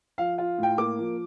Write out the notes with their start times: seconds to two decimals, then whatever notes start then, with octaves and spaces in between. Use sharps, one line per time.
0.18 F3 F5
0.38 F4
0.58 A2 G5
0.78 A#3 D6
0.99 F3